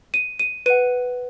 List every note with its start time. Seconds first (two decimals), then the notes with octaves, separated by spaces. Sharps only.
0.14 D#7
0.39 D#7
0.66 B4 F#5 D#7